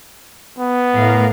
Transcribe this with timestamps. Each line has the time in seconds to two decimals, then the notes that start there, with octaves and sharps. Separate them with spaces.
0.58 B3
0.94 A2 A#4 F5